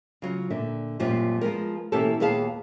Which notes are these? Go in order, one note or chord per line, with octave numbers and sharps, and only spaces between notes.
C#3 F#3 F4
A#2 D3 E5
F#2 A#2 F3 G3 C4
F3 G#3 B3 A#4
B2 E3 A#3 C#4 G4 A4
D#2 A#2 B3 G#4 F5 A5